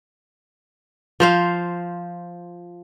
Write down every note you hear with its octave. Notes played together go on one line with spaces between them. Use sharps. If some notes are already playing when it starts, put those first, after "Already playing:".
F3 C5 F5